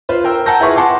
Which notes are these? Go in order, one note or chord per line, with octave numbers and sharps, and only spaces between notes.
F4 B4 C5
A#4 G5 E6
F#5 G5 A5 A#5 G6 A#6
E4 F4 G#4 B4 E5 C#6
F#5 A5 C6 D6